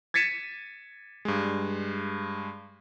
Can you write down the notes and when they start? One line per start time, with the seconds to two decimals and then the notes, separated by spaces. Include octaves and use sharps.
0.14 G#6 A6 B6 C#7 D#7 E7
1.25 G2 G#3